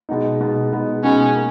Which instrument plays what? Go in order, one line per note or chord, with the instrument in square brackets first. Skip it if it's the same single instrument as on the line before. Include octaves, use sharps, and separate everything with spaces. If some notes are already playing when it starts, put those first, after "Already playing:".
[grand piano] B2 G#3 B3 D#4
B2 G#3 B3 D#4
B2 G#3 B3 D#4
[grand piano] B2 G#3 B3 D#4 [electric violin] C#4
[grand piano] A#3